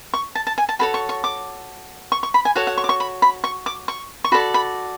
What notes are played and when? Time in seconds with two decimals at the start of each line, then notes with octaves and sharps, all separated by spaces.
0.14 C#6
0.35 A5
0.47 A5
0.58 G#5
0.69 A5
0.79 F#4 A4 C#5 B5
0.94 C#6
1.09 C#6
1.24 D6
2.12 C#6
2.23 C#6
2.34 B5
2.45 G#5
2.56 F#4 A4 C#5 F#5
2.67 F#5
2.78 C#6
2.84 D6
2.89 C#6
3.00 B5
3.22 B5
3.44 C#6
3.66 D6
3.88 C#6
4.24 C#6
4.32 F#4 A4 D5 B5
4.54 B5